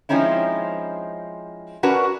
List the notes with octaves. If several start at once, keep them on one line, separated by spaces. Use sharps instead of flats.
F3 G#3 C4 C#4 D#4 E4
C#4 D4 F#4 A#4 B4